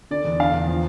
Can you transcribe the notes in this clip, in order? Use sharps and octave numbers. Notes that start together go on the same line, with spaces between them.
D3 D5
E2
D3 F5
E2
F3